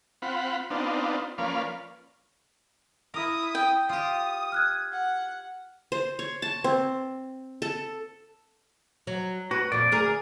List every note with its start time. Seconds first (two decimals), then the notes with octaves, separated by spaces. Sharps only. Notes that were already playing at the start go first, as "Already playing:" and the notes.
0.22 C4 F4 F#5 B5
0.70 B3 C4 D4 D#4 F4
1.38 F3 A#3 C#4 B4 D5 F5
3.14 E4 A#4 D#6
3.55 G5
3.89 F4 G4 D#6
4.52 F6 F#6 G#6
4.92 F#5
5.92 C5
6.19 C#5
6.42 A5
6.64 C4
7.62 A4
9.07 F#3
9.51 F#4 B4
9.72 F2 A#2 D5
9.91 D2 G#4 A#4